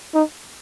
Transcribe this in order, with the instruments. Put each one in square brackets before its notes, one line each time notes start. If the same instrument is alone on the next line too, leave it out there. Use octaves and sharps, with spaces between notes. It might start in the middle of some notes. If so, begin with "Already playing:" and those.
[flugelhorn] D#4